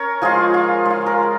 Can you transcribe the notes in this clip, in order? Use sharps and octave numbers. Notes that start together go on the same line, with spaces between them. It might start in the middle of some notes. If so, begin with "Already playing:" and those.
Already playing: C#4 A#4 C#5
F3 G#3 F4 G#4
F4
G#3 F4
A#4